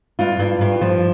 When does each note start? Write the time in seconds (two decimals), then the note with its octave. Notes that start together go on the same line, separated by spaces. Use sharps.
0.19 G2 F4
0.39 G2
0.61 G2
0.81 F3